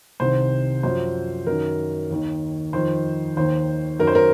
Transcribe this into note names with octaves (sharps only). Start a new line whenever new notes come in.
C2 C3 D#3 C5
F#2 F3 C5
F#2 D#3 A#4
D#2 D#3
F2 D#3 C5
D#2 D#3 C5
F#2 D#3 A#4
C5
A#4